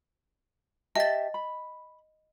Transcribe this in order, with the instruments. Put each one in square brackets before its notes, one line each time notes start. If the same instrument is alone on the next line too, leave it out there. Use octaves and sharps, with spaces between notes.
[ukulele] G4 E5 A5 [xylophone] D#5 A6
[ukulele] B5